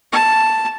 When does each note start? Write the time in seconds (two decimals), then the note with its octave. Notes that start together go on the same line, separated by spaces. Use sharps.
0.12 A5